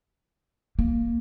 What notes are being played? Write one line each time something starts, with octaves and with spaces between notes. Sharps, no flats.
A#3